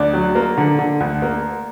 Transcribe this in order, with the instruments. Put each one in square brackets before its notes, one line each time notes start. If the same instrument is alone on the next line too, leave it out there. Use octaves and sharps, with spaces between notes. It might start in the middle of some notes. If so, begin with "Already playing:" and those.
Already playing: [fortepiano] D2 [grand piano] D5
[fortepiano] F#3
A#3
D3
D3
D2
A#3